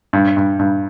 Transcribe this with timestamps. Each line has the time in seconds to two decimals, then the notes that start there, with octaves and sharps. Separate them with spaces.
0.13 G2
0.37 G2
0.59 G2